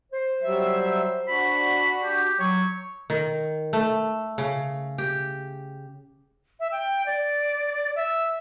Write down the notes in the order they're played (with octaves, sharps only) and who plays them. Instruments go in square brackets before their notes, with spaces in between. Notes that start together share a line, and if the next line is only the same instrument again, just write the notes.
[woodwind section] C5
[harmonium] F#3 G3 E5
[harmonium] D4 F#4 [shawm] B5
[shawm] G4
[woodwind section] F#3 [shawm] C#5
[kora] D#3
A3
C#3
G4
[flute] E5
G5
D5
E5